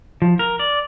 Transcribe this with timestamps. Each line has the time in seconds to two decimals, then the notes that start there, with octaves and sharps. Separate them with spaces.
0.22 F3
0.39 A#4
0.59 D5